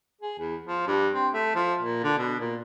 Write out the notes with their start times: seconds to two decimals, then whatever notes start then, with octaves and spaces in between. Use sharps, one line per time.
0.21 G#4
0.39 E2
0.66 F3
0.87 G2
1.14 C4
1.34 A3
1.55 F3
1.82 A#2
2.03 D3
2.18 B2
2.40 A#2